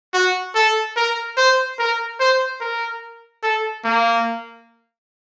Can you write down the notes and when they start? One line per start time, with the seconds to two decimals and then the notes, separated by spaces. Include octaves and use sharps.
0.14 F#4
0.55 A4
0.97 A#4
1.38 C5
1.79 A#4
2.20 C5
2.61 A#4
3.43 A4
3.85 A#3